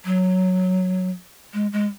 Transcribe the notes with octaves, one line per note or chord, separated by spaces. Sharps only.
F#3
G#3
G#3